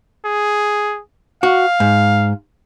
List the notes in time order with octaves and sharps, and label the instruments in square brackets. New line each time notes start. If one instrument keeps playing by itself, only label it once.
[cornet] G#4
[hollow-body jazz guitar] F#4 [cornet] F5
[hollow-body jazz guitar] G#2